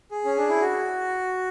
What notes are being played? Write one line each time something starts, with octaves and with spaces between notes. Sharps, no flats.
G#4
C#4
D4
E4
F#4